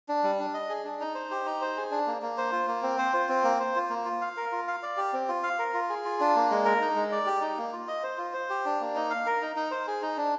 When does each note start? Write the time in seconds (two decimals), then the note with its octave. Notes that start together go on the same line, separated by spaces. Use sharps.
0.09 D4
0.23 G3
0.39 D4
0.54 D#5
0.69 G#4
0.84 D4
1.00 D#4
1.15 C5
1.31 G4
1.46 D#4
1.61 C5
1.77 G#4
1.91 D4
2.07 A#3
2.22 A#3
2.38 C5
2.52 F4
2.68 A#3
2.83 C4
2.98 C5
3.13 F4
3.29 C4
3.44 A#3
3.60 C5
3.76 F4
3.90 A#3
4.05 F4
4.21 F5
4.37 A#4
4.52 F4
4.67 F5
4.83 D5
4.97 G4
5.13 C4
5.28 F4
5.43 F5
5.59 A#4
5.74 F4
5.89 G#4
6.05 F4
6.20 D4
6.36 A#3
6.51 G#3
6.65 A#4
6.81 D#4
6.96 G#3
7.12 D5
7.26 G4
7.42 D#4
7.58 A#3
7.73 F4
7.88 D#5
8.03 C5
8.18 F4
8.33 C5
8.50 G4
8.65 D4
8.80 A#3
8.95 D#4
9.10 F5
9.26 A#4
9.42 D#4
9.56 D#4
9.71 C5
9.87 G#4
10.02 D#4
10.17 D4